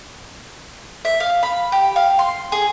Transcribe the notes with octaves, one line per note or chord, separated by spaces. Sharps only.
E5
F5
B5
G4
F5
C6
G#4